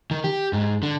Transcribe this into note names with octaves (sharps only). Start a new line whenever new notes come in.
D#3
G4
G#2
D3